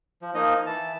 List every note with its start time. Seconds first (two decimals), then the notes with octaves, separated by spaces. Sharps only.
0.22 F3
0.35 F3 A#3 D#4 D#5
0.66 E3 A5